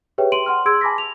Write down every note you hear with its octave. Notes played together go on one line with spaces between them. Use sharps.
G4 G#4 B4 C#5 E5 G5
C6 D7 D#7 F#7
F#5 C6 F6
G#4 C6 E6 G#6 D7
G#5 A5 B5 D6 A#6 B6
F7